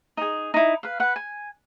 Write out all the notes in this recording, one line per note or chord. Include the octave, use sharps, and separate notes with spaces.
D#4 G#4
D#4 E4
B4 F5
B4 F#5
G#5